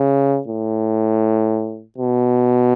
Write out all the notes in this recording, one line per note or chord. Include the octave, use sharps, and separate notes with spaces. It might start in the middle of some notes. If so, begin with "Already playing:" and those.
Already playing: C#3
A2
B2